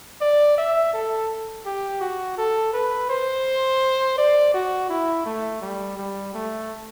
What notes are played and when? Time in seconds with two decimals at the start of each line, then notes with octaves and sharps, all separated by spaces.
0.21 D5
0.58 E5
0.94 A4
1.66 G4
2.01 F#4
2.38 A4
2.73 B4
3.10 C5
4.18 D5
4.54 F#4
4.90 E4
5.26 A3
5.62 G3
5.98 G3
6.34 A3